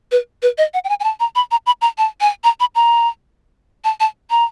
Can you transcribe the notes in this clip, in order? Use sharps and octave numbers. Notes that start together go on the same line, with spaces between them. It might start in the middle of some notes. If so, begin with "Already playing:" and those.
B4
B4
D#5
F#5
G5
G#5
G#5
A5
A#5
B5
A#5
B5
A#5
A5
G#5
A#5
B5
A#5
A5
A5
A#5